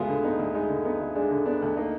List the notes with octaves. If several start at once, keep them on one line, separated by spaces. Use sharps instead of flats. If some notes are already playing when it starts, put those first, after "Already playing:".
Already playing: D2 G#3 B3 F4 F#4 G#4
D3
B3 D#4
D2
G#3 D#4
D3
B3 D#4
D2
G#3 D4
D3
B3 D4
D2
A#3 D#4